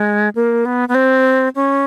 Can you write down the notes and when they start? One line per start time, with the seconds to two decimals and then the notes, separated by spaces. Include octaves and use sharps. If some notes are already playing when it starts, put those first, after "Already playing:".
Already playing: G#3
0.35 A#3
0.65 B3
0.89 B3
0.95 C4
1.55 C#4